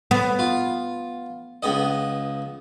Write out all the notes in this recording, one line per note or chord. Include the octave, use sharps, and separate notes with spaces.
B3
F4
C#2 B3 D#5